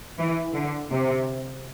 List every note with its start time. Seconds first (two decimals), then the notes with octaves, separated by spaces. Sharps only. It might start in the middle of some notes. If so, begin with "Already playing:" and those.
0.18 E3
0.54 D3
0.90 C3